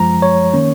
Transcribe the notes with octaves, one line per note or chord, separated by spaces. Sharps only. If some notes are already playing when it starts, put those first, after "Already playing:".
Already playing: F#2 F3 G#3 A#5
C#5
D#3 A#3 C#4